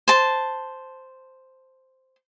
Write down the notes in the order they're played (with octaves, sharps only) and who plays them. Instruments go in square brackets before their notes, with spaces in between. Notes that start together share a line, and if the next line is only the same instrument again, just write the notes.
[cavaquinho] C5 A5